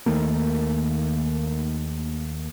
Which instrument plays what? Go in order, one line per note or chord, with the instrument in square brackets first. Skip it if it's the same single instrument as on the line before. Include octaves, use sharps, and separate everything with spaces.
[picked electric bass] D#2 D#3 A3 A#3